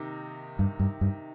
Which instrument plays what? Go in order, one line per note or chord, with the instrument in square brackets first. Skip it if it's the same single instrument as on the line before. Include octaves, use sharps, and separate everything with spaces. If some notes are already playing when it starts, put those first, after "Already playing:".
Already playing: [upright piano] C3 D#3 A#3 D#4
[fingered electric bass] G2
G2
G2